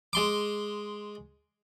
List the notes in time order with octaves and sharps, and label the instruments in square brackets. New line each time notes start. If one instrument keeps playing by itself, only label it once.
[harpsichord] G#3 C6 D6